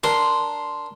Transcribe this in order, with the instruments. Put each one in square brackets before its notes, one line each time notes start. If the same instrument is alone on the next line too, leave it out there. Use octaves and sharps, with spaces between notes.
[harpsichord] D4 A#4 [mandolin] C6